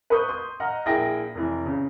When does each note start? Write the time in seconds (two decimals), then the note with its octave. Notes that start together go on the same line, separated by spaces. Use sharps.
0.10 B4 C#6 D#6 G6
0.29 C6 D#6 G6
0.60 D#5 F#5 A#5 F6
0.85 A#1 E4 G#4 A#4 G5 A#6
1.35 F1 E3
1.65 C#3